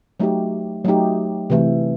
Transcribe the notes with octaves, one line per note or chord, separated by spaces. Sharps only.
F#3 A3 D#4 G4
F#3 A3 D#4 G4
C3 E3 A3